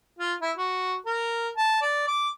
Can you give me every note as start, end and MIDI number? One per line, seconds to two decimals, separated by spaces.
0.19 0.33 65
0.42 0.52 64
0.57 0.95 66
1.06 1.49 70
1.57 1.81 81
1.82 2.06 74
2.07 2.29 86